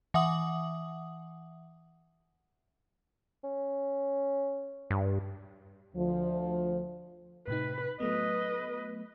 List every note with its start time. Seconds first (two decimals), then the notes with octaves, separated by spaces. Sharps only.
0.14 E3 E5 F#5 D#6 F#7
3.44 C#4
4.91 G2
5.96 D2 F3
7.48 A2 C3 D#4 B4
8.00 F#3 A3 B3 B4 D#5